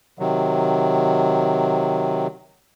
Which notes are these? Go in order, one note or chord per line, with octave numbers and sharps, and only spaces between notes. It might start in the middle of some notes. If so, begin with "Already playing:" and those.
C3 D#3 F#3